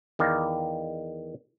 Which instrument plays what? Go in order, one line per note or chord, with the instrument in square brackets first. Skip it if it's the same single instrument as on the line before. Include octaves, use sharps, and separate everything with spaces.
[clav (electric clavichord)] E2 D#3 D5 F5 A#5